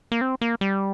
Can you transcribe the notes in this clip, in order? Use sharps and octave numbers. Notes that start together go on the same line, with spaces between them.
A#3
C4
A#3
G3